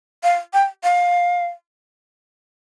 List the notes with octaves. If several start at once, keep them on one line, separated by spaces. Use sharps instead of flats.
F5
G5
F5